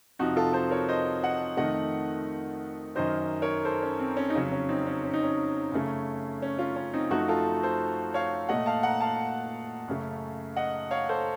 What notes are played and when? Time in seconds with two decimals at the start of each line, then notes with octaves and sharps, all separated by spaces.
0.19 F2 C3 F3 D#4 F#4
0.36 F4 A4
0.53 A4 C5
0.70 A#4 C#5
0.89 C5 D#5
1.23 D#5 F#5
1.57 F2 D#3 A3 D#5 F#5
2.95 F#2 D#3 F#3 C5 D#5
3.42 A#4 C#5
3.65 A4 C5
3.82 C#4
4.00 C4
4.17 C#4
4.30 D#4
4.35 F2 C#3 F#3 C#4
4.52 C#4
4.69 C4 D#4
4.86 C#4
5.04 C#4
5.13 D#4
5.23 C#4
5.72 F#2 C#3 A3
6.42 C#4
6.58 C#4 F4
6.76 C#4
6.94 C4 D#4
7.11 F#2 F3 A3 D#4 F#4
7.28 F4 A4
7.63 A4 C5
8.14 C#5 F5
8.49 A#2 A3 D#5 F#5
8.66 F5 A5
8.83 F#5 A#5
9.01 F5 A5
9.88 F#2 C#3 A3
10.56 D#5 F#5
10.91 C#5 F5
11.09 A4 C5